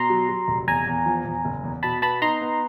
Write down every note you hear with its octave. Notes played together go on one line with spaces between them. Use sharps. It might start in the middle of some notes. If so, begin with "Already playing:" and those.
Already playing: B2 A#5 C6
F#3
F#3
F1
E2 G#5 A#5
E2
F3
E2
F#1
E2
B2 A5 B5
B3 A5 B5
D#4 A#5 C6
B3